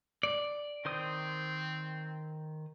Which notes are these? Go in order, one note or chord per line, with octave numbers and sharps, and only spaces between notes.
D5
D#3 C4 C5 D#6